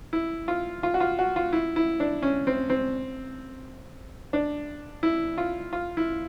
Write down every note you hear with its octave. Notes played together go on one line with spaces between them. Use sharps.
E4
F4
F4
F#4
F4
F#4
F4
E4
E4
D4
C#4
C4
C4
D4
E4
F4
F4
E4